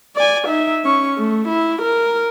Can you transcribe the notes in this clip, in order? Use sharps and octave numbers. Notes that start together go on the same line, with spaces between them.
D5 G#5
D#4 E5
C#4 C#6
A3
E4
A#4